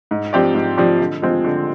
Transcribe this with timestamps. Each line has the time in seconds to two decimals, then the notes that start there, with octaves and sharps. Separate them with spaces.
0.11 G#2
0.33 F3 C4 G4 D5
0.55 G#2
0.77 F3 C4 G4 D5
1.00 D3
1.22 F3 G#3 C4 F4
1.44 D3